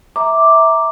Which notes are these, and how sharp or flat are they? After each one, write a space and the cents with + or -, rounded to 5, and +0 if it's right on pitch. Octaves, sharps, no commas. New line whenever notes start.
E5 -15 A#5 +0 D6 +0